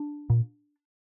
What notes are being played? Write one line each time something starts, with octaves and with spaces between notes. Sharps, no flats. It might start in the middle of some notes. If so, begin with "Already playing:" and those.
Already playing: D4
A#2